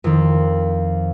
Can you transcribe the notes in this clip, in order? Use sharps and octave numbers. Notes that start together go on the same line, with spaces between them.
F2 D#3 C4 F4